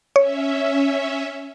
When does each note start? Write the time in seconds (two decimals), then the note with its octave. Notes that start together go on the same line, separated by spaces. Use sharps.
0.16 C#4 C#5 E5